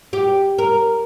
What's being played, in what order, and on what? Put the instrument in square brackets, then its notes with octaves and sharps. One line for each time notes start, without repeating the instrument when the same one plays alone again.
[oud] G4
A#4